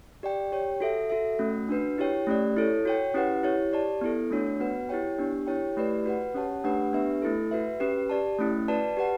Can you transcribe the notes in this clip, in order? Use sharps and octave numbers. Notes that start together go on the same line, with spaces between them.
G4 D5 G5
G4 C#5 G5
F#4 A4 E5
F#4 A4 E5
A3 C#4 F#4
D4 F#4 B4
E4 G4 C#5 G5
A3 C#4 G4 D5
E4 A4 C#5
F#4 C#5 G5
C#4 E4 G4 B4 F#5
E4 G4 C#5
G4 D5 A5
B3 E4 A4
A3 D4 F#4 C#5
B3 F#4 B4 F#5
E4 G4 C#5 G5
B3 D4 G4
E4 G4 C#5 G5
A3 E4 G4 B4 D5
F#4 B4 F#5
C#4 G4 C#5 F#5 A5
A3 D4 G4 B4 F#5
B3 D4 G4 B4 E5
A3 E4 A4
F#4 B4 E5
C#4 G4 B4
G4 D5 A5
A3 C#4 E4
F#4 B4 D5 A5
G4 B4 F#5 A5